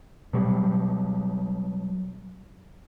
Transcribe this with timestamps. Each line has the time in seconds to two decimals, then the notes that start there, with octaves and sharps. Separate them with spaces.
0.33 B2 F#3 G3